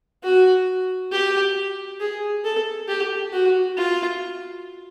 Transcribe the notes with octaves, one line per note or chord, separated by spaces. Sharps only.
F#4
G4
G#4
A4
G4
F#4
F4